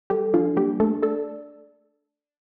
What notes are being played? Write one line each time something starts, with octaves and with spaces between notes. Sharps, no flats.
G3 G4 A4
F3 D4 F4
G3 A#3 G4
A3 D4 A4
A3 A4 D5